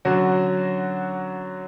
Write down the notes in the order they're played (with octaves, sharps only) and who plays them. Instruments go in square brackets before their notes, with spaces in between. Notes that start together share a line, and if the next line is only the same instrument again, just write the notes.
[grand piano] D3 F#3 C#4 F#4